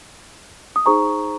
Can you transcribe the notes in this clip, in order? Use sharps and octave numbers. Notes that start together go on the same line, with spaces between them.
D#6
D#4 G#4 C5 A#5 C#6